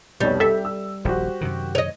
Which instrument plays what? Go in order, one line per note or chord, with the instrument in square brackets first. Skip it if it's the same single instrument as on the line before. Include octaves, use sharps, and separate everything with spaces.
[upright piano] F1 B1 C#5 [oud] G3
[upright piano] G4 [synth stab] A4 E5
[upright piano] E6
[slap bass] D#1 A#1 [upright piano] F#4 G4 C5
[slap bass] F#2 C3 D#3
[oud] C#5 D#5